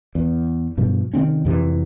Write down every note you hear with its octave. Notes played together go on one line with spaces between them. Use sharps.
E2
G2 B2 F3
C3 D#3 C4 C#4
F2 C3 E3